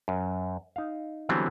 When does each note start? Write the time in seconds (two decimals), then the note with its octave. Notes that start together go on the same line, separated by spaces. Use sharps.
0.08 F#2
0.76 D#4 F5
1.29 D3 E3 F#3 G3 B3 C4